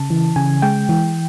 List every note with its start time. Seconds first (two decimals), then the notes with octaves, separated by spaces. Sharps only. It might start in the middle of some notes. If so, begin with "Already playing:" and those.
Already playing: C#3 A5
0.10 E3
0.36 C#3 G#5
0.62 G#3 G5
0.89 E3